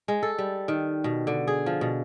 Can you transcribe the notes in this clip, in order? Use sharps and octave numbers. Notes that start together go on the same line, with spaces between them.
G#3
A4
G3
D#3
B2
D3
G#4
F3
B2